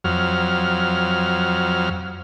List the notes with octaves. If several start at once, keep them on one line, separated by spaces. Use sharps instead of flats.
F2 F#3 F6